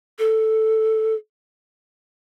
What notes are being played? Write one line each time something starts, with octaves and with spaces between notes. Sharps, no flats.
A4